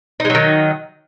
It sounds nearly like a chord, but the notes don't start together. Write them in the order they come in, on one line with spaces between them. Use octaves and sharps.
D#4 G#3 F#3 D#3